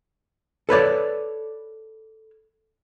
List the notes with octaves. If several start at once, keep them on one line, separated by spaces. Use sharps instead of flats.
A4 B4 C#5 D5